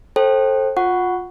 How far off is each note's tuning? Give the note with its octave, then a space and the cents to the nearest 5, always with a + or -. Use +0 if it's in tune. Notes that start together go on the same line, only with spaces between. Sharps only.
A4 +0 C5 +25 G5 +0
F4 +25 F#5 +0 C#6 +5